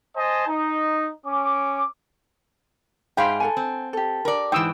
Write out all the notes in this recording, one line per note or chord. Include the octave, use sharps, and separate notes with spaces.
C5 D#5 G#5 A5
D#4
C#4 D6
G#2 G#4 E5 F5 G5 B5 C6
A4 F#5 G#5
C4
G4 A4
A#4 D5
G#2 E3 G5 D#6 E6